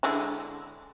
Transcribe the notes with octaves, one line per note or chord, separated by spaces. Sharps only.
D3 G#3 E4